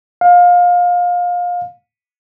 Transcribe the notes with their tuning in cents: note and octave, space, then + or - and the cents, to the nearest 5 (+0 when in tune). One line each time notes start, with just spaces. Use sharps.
F5 +25